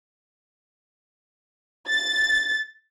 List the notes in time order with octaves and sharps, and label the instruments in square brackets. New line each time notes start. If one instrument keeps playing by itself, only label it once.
[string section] A6